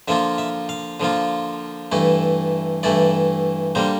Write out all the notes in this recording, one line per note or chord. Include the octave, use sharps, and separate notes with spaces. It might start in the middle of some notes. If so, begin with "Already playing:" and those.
D3 F3 A#3 F4 E5
E5
F5
D3 F3 A#3 F4
G2 E3 A3 E4
G2 E3 A3 E4 D5
D3 G3 A#3 C5